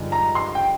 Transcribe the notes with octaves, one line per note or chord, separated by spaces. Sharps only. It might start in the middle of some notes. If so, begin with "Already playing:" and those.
Already playing: G2 D3 F3 G#3 D#4
A#5
C6
G5